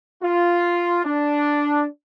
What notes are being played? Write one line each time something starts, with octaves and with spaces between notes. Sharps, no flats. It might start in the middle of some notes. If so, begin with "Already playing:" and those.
F4
D4